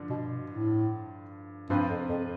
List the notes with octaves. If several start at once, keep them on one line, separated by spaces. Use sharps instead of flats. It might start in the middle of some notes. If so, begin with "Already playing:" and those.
Already playing: G2 D3 F3
B2
A2
G2 C3 F3 C4 F4 B4
F2
F2